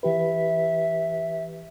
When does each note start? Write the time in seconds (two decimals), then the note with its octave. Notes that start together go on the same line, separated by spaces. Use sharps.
0.03 E3 G4 B4 E5